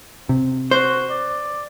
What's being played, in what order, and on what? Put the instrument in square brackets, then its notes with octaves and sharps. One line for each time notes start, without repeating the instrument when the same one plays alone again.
[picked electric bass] C3
[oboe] F#4 [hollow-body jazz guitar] C5
[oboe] D5